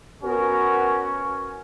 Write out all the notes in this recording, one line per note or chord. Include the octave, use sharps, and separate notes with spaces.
B3 C#4 F#4 A#4